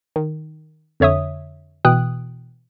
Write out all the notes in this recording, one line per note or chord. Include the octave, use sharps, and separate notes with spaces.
D#3
F2 D3 C#5 E5 D#6
B2 E3 G5 D#6 F#6